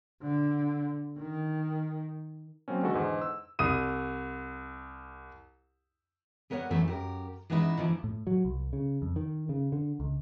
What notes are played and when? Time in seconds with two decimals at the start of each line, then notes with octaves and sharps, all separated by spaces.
0.23 D3
1.18 D#3
2.68 F#3 A#3 C4 C#4
2.83 D3 D#3 G#3 B3 F#4 A4
2.94 E2 G#2 D3
3.22 E6
3.59 C2 D#6 D#7
6.50 G3 B3 A#4 C#5 D#5 F#5
6.70 F#2 A2 E3 A3
6.88 F#2 G4 A#4
7.50 E3 G#3 B3 C#4 D#4 E4
7.77 D3 E3 F3 A#3
8.04 A2
8.27 F#3
8.45 C2
8.73 C#3
9.02 F2
9.16 D#3
9.49 C#3
9.72 D3
10.00 C#2